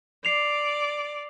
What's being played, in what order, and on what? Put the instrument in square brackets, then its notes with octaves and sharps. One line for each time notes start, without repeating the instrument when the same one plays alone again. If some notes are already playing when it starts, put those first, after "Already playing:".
[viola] D5 [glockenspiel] C7 F7